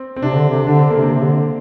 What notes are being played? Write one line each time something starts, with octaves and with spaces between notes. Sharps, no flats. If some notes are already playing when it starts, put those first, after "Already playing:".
Already playing: C4
C4
C3 D4
D3
C3
D3 D4
C4
A#3
C3
C4
C3
D3